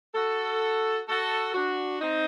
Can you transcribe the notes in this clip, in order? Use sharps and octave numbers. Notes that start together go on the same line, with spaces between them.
F#4 A4
F#4 A4
D4 F#4
C4 D#4